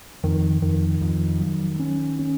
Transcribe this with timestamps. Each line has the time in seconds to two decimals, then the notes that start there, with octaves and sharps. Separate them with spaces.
0.24 F2 D#3
0.62 F2 D#3
1.01 F2
1.41 F#3
1.80 C#4
2.19 C#4